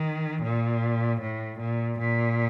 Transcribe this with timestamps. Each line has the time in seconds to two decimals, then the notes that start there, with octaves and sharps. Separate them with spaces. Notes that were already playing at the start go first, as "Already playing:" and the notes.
Already playing: D#3
0.43 A#2
1.21 A2
1.60 A#2
1.99 A#2